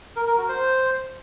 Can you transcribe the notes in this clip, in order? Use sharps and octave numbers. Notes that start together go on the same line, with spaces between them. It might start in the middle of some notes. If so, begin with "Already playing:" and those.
A#4
A#4
F#4
C5